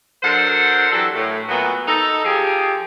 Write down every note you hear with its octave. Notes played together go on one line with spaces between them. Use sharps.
F#3 D4 A4 A#4 C5 F#5
E3 F#3 G4 A4
A2
A#2 F#3 A3 B3
D#4 A4
F3 G4 G#4